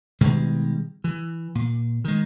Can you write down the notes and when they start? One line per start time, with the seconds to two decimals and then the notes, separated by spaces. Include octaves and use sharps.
0.21 B2 D#3 G3 G#3
1.04 E3
1.55 A#2
2.04 D#3 G#3